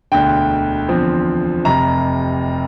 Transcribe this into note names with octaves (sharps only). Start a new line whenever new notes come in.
E1 D2 D3 G5
E2 D3 F3 C4
F1 F2 C3 A#5